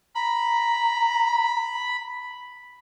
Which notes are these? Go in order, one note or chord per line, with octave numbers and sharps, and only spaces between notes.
A#5 B5